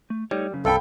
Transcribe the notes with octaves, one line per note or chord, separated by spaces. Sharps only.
A3
G3 A3 D#4 C#5
F#2 C#3
C2 A4 F5 G5 B5